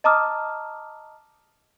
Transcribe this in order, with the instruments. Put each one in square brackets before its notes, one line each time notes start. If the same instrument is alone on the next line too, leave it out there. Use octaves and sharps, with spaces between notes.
[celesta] D#5 A5 A#5 D6 D#6 F6